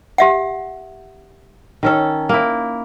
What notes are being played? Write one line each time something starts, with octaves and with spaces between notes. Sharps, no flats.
G4 E5 F#5
D#3 C#4 A4
A#3 E4